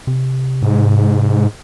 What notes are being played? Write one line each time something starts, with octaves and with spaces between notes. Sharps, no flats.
C3
G#2